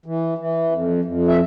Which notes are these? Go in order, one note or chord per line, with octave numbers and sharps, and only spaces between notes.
E3
E3
F2
F2
E5